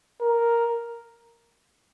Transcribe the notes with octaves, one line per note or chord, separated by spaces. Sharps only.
A#4